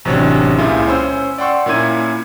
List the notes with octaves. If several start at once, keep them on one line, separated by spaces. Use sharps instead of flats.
A1 C3 F#3 C#4 D4 C#5
C#2 A#2 C#3 E4 F4
C#4 C5 E6
D5 F#5 G5 C6 C#6 E6
A#2 A#3 C#4 E4 G#6 D#7